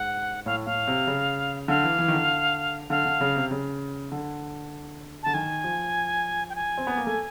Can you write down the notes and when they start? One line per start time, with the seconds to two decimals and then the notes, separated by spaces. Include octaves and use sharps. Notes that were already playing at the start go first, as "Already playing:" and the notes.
Already playing: G#2 F#5
0.46 A2 F5
0.66 A2 F5
0.88 C3
1.07 C#3
1.68 D3 F5
1.83 E3
1.98 E3
2.08 D#3
2.14 D3
2.90 D3 F5
3.05 D3
3.21 C#3
3.36 C3
3.51 C#3
4.12 D3
5.23 D3 A5
5.34 D#3 G#5
5.64 F3
6.50 G5
6.56 G#5
6.77 C4
6.87 B3
6.97 A#3
7.07 A3